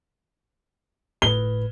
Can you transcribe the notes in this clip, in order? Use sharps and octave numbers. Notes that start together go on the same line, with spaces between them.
G1 A2 B4 G7